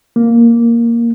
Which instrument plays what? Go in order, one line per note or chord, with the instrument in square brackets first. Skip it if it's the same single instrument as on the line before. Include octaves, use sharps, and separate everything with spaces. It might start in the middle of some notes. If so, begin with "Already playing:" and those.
[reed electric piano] A#3